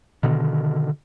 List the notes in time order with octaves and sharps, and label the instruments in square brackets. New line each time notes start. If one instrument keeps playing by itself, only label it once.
[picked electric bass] B2 D3 D#3